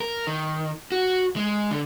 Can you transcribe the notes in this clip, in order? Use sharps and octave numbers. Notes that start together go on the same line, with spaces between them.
A#4
D#3
F#4
G#3
D3